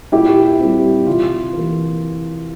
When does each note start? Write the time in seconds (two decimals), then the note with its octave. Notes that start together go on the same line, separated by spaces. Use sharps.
0.12 A#2 E4 G4
0.60 G3 C4
1.07 C3 F4
1.53 E3 A#3